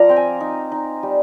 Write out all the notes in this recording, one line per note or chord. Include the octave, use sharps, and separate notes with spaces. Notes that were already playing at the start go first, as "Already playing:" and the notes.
Already playing: F3 F4 D5 A#5
C4 G5
G#5
D#4
D#4
G3